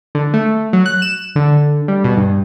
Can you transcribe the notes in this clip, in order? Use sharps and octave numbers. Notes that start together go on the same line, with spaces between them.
D3
A3
F#3
F#6
E7
D3
G3
B2
G2